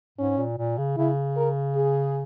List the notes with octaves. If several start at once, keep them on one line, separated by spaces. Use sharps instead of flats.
G#2 C#4
A#2
A#2
C#3
C#3 E4
A#4
G#4